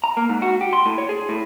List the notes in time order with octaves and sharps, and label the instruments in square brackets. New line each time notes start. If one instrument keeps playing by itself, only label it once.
[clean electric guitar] A#5
A#3
G#2
F#4
G4
C6
A2
C#5
G#4
A2